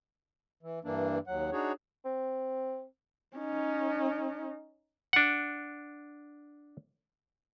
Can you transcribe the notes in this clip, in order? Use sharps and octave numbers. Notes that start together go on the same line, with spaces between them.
E3
G2 E3 A#3 D4
D#2 F#3 F#5
D4 D#4 F#4 G#4 C#5
C4
C#4 D#4
D4 F#5